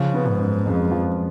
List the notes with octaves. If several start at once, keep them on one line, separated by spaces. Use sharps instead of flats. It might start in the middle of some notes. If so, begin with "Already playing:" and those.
Already playing: C#3 F3
B3
G#2
F#2
F2 G#3
F3